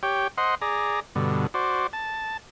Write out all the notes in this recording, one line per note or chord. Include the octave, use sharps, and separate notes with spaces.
G4 C#5 G5
C5 D#5 F#5 C6
G#4 D5 A#5
G2 B2 D3
F#4 C5 D5
A5